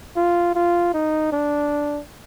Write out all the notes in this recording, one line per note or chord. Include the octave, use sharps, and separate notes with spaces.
F4
F4
D#4
D4